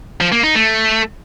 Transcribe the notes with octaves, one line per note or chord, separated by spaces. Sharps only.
F3
A#3
D#4
A3